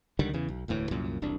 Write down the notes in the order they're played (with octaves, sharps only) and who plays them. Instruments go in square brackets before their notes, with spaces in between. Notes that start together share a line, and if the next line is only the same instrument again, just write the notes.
[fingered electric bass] C#2 D3 D#3 G3
E2 C#3 E3
B1
E1 D2 A2 E3
C2 F#2 A#2
E1 C2 D4